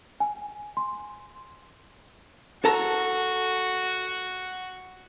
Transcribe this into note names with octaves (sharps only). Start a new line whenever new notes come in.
G#5
C6
F#4 A4 A5 A#5